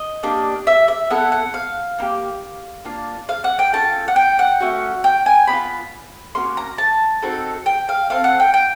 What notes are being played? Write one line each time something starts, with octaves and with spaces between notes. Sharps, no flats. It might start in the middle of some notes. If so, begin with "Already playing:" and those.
Already playing: D#5
A#3 D4 G4
E5
E5
B3 E4 A4 F#5
F#5
F5
A#3 D#4 G4
A#3 D4 F4
F5
F#5
G5
C#4 F4 A4 A5
F#5
G5
F#5
A3 C#4 F#4
G5
G#5
B3 D4 B5
F4
A#3 C#4 F#4 C6
A#5
A5
C4 D#4 F#4 A4
G5
F5
C4 F4 A4 F5
F#5
G5
G5